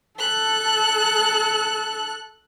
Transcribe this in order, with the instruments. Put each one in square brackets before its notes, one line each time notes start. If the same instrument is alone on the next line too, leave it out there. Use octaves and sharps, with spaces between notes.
[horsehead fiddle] A4 [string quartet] F#6